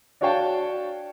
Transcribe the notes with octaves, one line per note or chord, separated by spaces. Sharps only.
D4 F#4 C#5 F5 G5 A5